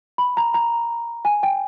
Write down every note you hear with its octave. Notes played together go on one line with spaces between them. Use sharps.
B5
A#5
A#5
G#5
G5